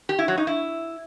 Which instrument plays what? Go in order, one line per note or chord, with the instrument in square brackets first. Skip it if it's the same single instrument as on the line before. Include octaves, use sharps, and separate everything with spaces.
[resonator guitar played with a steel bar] G4
E4
F#3
D#4
E4